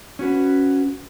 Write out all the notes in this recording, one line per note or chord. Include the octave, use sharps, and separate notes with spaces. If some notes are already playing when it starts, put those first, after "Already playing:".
C#4 F#4 B4